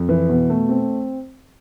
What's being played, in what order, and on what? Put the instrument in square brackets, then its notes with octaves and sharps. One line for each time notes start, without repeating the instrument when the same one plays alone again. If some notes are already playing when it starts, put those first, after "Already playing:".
Already playing: [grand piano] F2
E3
B2
A3
C4